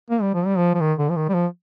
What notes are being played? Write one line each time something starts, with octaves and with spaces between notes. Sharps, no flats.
A#3
G3
F3
G3
F3
F3
D#3
D3
F3
D#3
G3
F3